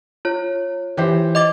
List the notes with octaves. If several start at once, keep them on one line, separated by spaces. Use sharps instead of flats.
F4 C#5
E3 G4 C5
D#5 D6 A6